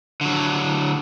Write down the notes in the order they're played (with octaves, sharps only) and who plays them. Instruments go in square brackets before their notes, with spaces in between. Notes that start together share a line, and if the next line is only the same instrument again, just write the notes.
[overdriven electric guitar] D3 F#3